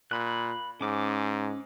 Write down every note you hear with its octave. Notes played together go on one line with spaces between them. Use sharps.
A#2 B5 F#6
G#2 C#4 D6